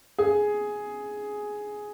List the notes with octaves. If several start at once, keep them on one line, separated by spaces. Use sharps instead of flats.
G#4